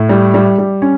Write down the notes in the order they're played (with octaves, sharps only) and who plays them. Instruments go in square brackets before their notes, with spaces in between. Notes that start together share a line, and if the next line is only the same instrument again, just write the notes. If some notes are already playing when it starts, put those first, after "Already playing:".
Already playing: [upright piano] A2
G3
G3
G3
C#4